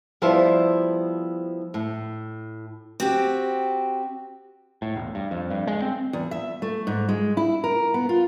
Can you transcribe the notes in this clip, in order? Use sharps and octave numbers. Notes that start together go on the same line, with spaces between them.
F3 G3 B3 E4 C5 A5
A2
C4 F#4 G4
A2
E1
G2
F2
G2
G#3
C4
E2
E5
A3
G#2
G#3
E4
A#4
B3
F4